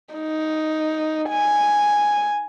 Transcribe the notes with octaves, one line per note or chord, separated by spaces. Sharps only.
D#4
G#5